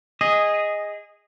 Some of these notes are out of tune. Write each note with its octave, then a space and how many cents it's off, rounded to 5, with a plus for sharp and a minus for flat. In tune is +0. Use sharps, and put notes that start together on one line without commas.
G#4 -15 D#5 +0